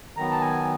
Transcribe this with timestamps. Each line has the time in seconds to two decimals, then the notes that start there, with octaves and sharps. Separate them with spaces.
0.17 D#3 F#3 B3 A#5
0.31 A5
0.41 G#5